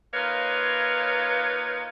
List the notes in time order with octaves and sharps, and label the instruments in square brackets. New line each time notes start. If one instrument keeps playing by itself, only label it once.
[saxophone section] A#3 D#4 F4 B4 C#5